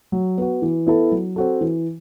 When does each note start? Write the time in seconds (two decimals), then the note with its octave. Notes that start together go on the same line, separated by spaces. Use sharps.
0.12 F#3
0.38 B3 F#4
0.62 E3
0.87 B3 E4 A4
1.12 F#3
1.36 C4 F#4 A4
1.61 E3